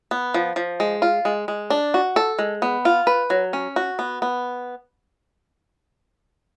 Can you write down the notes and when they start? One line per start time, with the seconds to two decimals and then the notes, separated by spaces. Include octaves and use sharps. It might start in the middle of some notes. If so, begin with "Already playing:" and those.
0.11 B3
0.34 F3
0.56 F3
0.80 G#3
1.02 F4
1.25 G#3
1.48 G#3
1.70 D4
1.94 F#4
2.16 A4
2.39 G#3
2.62 B3
2.85 F4
3.07 B4
3.30 F#3
3.53 C#4
3.76 F#4
3.99 B3
4.22 B3